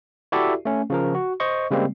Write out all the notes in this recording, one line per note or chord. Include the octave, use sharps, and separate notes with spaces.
E4 F#4 G4 A4 D5 E5
A3 C#4
C#3 F3 A#4
F#4
C5 D#5 C#6
C#3 G3 G#3 A#3 C4